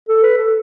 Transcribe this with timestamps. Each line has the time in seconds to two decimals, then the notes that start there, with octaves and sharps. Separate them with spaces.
0.09 A4
0.23 B4
0.38 A4